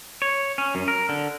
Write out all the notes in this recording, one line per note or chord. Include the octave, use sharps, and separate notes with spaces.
C#5
C#4
F#2
A#4
D3